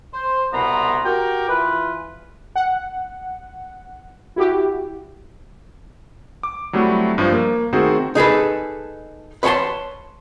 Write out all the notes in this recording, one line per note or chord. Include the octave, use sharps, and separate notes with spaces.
C5
C2 B2 B3 A#5 C6
F#4 G4 A#4 G5 D6
E3 F4 B4
F#5
E4 F#4 G4
D6
F#3 G3 A3 C4 E4 F#4
G2 F3 C5
A#3
D#3 A3 C4 F#4 G#4 C5
D#4 G#4 A4 B4
B4 C#5 G5 A5 C6